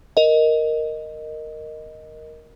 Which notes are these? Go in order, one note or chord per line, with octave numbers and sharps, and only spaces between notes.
A#4 D#5